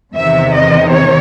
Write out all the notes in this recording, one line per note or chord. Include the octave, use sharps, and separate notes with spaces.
E2 C3 D#3 E5
D#5
C#5